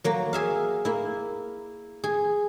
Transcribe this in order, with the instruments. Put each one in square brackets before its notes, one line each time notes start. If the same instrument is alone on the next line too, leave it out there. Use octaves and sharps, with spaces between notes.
[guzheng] F#3 A#3
G#4 E5 F5
A#3 E4
G#4